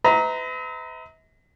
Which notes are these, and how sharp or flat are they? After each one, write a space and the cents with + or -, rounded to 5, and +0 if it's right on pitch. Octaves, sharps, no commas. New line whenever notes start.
B4 +40 E5 -45 A#5 +0